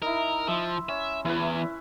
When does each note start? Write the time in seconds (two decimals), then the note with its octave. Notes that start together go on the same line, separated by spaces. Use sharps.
0.02 D#4 E4 A#4
0.48 F3 E5 A#5 C6
0.89 C#4 E5
1.25 E2 E4 B4